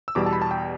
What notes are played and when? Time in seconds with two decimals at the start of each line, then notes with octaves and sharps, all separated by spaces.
0.08 E6
0.15 E2 B2 G3 D6
0.26 A5
0.33 B5
0.42 A5
0.51 G5